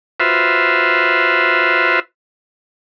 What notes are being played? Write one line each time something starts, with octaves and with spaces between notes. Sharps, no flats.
F4 F#4 B4 C5 E5